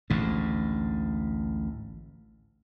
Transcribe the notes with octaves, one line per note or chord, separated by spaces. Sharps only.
A1 D2 G#2